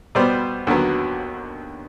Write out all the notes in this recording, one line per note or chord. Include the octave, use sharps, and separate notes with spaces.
B2 G3 B3 C5 D5
D#2 D3 F#3 B3